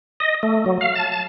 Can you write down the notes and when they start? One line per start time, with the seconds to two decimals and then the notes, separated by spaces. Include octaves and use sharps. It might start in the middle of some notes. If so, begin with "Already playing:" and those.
0.20 D#5
0.43 A3
0.66 F#3
0.81 F5
0.95 A5
1.12 A5